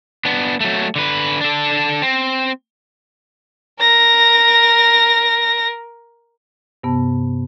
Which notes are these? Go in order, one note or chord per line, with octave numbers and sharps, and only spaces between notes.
B3 D4
F#3 A3
D3 B4
D4 A4
C4
A#4 A#6
G2 C3 B3 A5